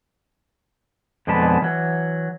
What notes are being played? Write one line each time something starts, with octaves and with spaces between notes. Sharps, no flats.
F2 B2 D3 G#3 B4 A5
E3 F#3